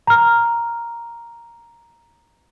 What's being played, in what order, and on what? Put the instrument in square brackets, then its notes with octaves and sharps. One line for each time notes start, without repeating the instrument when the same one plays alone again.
[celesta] A#5 F6